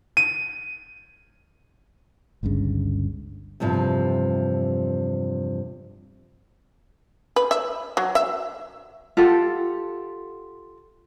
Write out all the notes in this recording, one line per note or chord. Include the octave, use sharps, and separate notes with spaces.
D#7
G1 C#2 G2 C#3
E2 G2 C3 F3
B4
E5
F#3
E5
F4 G4 A4 F#5